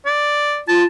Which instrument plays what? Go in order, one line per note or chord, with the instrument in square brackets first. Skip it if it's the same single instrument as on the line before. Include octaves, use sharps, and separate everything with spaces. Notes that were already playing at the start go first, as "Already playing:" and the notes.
[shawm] D5
[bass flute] F4 [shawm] A5